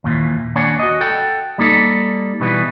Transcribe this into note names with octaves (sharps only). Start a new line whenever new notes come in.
D#2 A#2 E3
D#2 A#3 D4 C#5 F#5 G#5
F#4 D#5
A4 F#5 G5
G3 A#3 D#4 A4
B2 E3 G3 B3